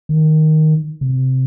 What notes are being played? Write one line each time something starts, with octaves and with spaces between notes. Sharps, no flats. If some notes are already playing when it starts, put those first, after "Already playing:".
D#3
C3